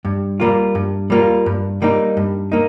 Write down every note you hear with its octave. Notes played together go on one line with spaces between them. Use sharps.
G2
G3 A#3 F4
G2
G3 A#3 F4
G2
G3 A#3 D#4
G2
A#3 D#4